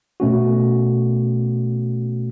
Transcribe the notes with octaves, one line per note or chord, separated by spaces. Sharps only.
B2 A3 C#4 F#4